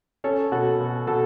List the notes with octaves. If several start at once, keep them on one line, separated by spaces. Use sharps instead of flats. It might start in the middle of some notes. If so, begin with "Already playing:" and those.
C#4 A4 C#5
B2 F#4 A4
B2
B2 F#4 A4